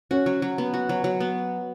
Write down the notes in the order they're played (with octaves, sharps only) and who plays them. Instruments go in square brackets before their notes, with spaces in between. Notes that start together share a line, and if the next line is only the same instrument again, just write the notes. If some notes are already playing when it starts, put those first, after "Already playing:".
[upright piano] C#4 [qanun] F#4
[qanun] F#3
F#3
B3
F#4
F#3
F#3
B3